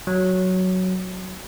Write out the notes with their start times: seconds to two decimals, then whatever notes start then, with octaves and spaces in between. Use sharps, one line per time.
0.07 F#3